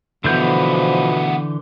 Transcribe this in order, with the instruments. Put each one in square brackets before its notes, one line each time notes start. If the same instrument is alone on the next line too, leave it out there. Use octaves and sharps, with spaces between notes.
[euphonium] B2 [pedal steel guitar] D3 E3 G6 [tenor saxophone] F3 [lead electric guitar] A3 B3